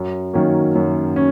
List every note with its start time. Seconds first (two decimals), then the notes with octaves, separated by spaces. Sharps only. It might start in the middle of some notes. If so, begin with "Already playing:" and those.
Already playing: F#2
0.34 D#3 F#3 A#3 C#4
0.75 F#2
1.16 C#4